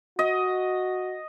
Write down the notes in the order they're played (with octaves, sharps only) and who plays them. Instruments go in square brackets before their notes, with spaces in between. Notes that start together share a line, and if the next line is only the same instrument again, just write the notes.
[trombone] F#4 [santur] D#5